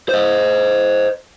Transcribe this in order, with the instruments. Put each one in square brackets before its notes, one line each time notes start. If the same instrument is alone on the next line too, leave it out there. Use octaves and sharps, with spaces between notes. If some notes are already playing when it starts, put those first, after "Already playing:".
[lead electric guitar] C5 D#5